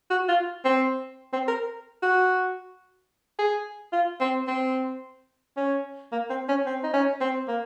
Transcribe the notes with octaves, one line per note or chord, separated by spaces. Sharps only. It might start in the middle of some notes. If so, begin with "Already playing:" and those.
F#4
F4
C4
C4
A#4
F#4
G#4
F4
C4
C4
C#4
A#3
C4
C#4
C4
D#4
C#4
C4
A#3